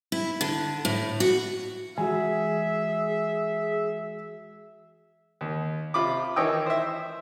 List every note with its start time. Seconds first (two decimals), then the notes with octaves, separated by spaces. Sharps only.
0.12 E4
0.41 D3
0.85 A2
1.20 F#4
1.98 E3 G#3 F#4 G#4 E5 G#5
5.41 D#2
5.94 C3 F4 B5 D6
6.36 D#3 E3 C#5 D#5 G5 E6
6.66 C5 E5